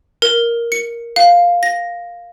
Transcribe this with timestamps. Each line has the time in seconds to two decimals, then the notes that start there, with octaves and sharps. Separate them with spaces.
0.22 A#4
0.72 C#7
1.16 F5
1.63 A#6